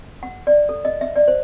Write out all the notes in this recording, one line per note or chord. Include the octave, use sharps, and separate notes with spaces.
F#5
D5
A4
D#5
E5
D5
C5